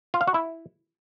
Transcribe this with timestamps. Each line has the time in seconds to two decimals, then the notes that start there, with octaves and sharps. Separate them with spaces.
0.14 F4
0.21 F5
0.28 F#4
0.34 E4